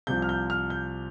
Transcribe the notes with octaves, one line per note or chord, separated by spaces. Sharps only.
C2 C3 F3 G6
F6
G6
F6
G6